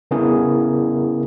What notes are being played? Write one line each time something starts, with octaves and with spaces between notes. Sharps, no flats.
C#3 B3 C#4 E4 G#4 A#4